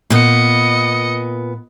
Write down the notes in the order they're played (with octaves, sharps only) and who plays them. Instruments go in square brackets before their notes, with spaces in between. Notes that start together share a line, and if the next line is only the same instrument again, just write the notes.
[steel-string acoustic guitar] A#2 B3 [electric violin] D#5 C#7